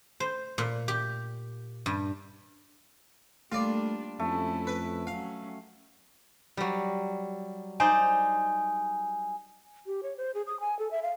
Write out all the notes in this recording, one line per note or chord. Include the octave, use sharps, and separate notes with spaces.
C5
A#2
G4
G2
G3 A3 A#3 D4 F4 D5
F2 A3 C#4 E4
B4
F#3 C#4 F5
F#3 G3
D#4 C5 D5 G#5
G4
C#5
C5
G#4
D#6
G#5
A4
E5
F5